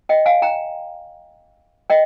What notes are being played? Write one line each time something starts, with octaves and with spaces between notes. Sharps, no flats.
D#5 G5
F5 G#5
G5 A#5
D#5 G5